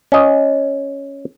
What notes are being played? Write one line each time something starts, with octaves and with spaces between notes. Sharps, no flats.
C#4 D#5